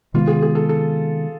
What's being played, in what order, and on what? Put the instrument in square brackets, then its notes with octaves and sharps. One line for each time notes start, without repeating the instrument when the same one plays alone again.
[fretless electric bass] C3 D#3 G#3 B3 [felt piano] F4
[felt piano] G#4
G#4
A4
A4